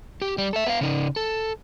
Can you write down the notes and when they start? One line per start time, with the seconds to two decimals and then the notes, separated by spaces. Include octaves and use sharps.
0.22 G4
0.38 G3
0.53 A4 E5
0.66 B3 F5
0.81 C#3 D#4
1.16 A4